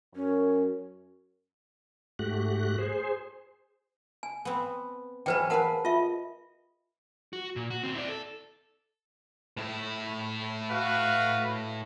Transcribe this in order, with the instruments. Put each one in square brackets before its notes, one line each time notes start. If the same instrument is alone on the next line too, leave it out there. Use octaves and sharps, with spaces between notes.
[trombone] F#2 [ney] C#4
[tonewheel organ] G#2 A3 F#4 G4 F#6
G#4 C5
[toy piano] G#5
[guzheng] B3 C4
[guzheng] E3 F#3 G#4 [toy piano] B4 C5 G5
[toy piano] A#4 F#5 A5 [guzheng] B4 F5 B5
[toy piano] F4 E5 [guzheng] D#5
[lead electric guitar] F#4
A#2
F#4
D#2 C4
E4 D5
A4
[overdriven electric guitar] A2 E4
[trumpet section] F#4 B4 F5